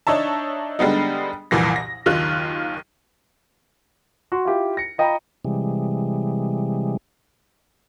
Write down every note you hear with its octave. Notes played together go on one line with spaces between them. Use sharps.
D4 D#4 C#5 E5 A5
D3 G3 G#3 B3 D#4
C2 F2 A#2 E3 A#6
A#6
F#1 D#2 D#3 F4 F#6
F#4 C6
E4 F4 G4
A#6 C#7
F4 D#5 G5 A#5 B5
C3 E3 G3 G#3